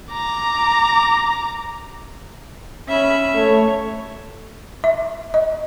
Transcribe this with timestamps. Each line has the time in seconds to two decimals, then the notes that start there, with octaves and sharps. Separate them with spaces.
0.13 A#5 D6
2.88 C#4 E5 B5
3.35 A3 C#5
4.84 E5
5.34 D#5